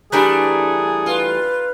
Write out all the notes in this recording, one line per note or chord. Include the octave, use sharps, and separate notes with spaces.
E3 G3 A3 D4 G#4 A#4
F4 B4